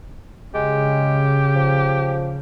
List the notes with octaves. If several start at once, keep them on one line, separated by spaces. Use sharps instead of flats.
C#3 G#3 G4
F3